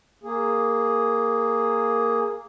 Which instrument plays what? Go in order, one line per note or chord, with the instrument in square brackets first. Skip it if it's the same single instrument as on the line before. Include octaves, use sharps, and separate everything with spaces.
[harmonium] A#3 G#4